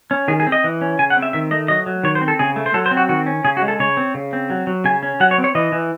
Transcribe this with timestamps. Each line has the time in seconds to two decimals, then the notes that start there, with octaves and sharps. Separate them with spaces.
0.11 C#4
0.28 D#3 G#4
0.40 G#4
0.47 C4
0.52 D#5
0.64 E3
0.81 C#4
0.99 C#3 G#5
1.10 F#5
1.17 C4
1.22 E5
1.33 D#3 E5
1.51 A3 D#5
1.68 F#3 D#5
1.86 F#3
2.03 D#3 C#5
2.15 C5
2.21 C4
2.28 A4
2.39 C#3 G#4
2.56 A3
2.66 C5
2.74 F#3 A4
2.86 C5
2.91 C4
2.97 F#4
3.09 D#3 F#4
3.26 C#4
3.44 C#3 G#4
3.57 F#4
3.62 G#3
3.68 A4
3.79 C#3 C#5
3.97 C4
4.15 C#3
4.33 C4
4.50 F#3
4.67 F#3
4.84 C#3 G#5
5.03 C#4
5.20 F#3 F#5
5.31 C#5
5.38 C4
5.44 C#5
5.55 E3 D#5
5.72 E3